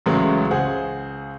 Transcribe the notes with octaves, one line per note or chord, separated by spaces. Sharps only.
A1 A2 C#3 E3 F#3 G#3
C#2 G#4 C5 F#5